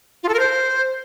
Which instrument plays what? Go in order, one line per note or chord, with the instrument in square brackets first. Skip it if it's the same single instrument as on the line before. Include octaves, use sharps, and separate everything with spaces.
[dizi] F4
A4
A#4
C5